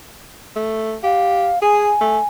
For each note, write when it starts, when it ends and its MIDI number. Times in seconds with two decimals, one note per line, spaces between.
0.56 0.97 57
1.03 1.50 67
1.03 1.59 77
1.62 1.92 68
1.62 2.28 80
2.01 2.19 57